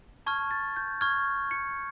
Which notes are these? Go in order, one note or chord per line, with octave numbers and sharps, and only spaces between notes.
A5 C#6 F6 G#6
A6
G6
C#6 F6 G#6
C#7